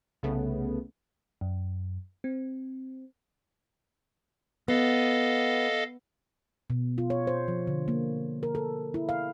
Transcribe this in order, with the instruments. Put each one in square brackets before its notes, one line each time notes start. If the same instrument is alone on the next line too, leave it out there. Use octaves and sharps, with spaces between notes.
[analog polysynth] C2 C#3 A3 B3
[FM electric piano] F#2
C4
[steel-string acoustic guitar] B3 [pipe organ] A4 D#5 F5
[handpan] B2
F4
C#5
C5
F3
D3
A#3
A#4
A4
E4
F5